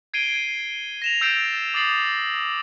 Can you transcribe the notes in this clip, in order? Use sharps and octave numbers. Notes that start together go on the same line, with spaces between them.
G#6 C7 D7 D#7 G7
A#6 E7 F7
E6 G6 A6 C7 D7 F7
D6 D#6 A6 C7 F#7